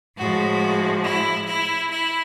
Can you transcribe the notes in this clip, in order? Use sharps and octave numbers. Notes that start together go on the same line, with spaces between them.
A2 F3 G#3 F#4
E4
E4
E4